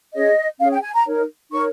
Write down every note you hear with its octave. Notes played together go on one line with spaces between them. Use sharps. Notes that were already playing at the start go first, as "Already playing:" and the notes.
C#4 G#4 C#5 D#5
C#4 G#4 C#5 F5
G5
G#5
A#5
D#4 A#4 C#5
D#4 A#4 C#5 C#6